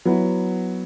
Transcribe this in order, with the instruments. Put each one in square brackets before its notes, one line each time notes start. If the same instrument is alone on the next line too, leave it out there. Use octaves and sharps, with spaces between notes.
[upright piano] F#3 B3 E4 B4